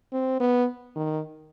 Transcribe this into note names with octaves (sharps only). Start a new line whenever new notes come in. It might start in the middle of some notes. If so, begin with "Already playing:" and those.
C4
B3
D#3